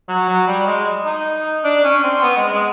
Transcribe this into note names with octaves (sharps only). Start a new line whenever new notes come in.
F#3
F#3
G3
G#3
D#4
D4
C#4
C4
B3
G#3
G#3